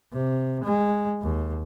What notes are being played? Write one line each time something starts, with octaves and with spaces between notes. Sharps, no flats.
C3
G#3
D#2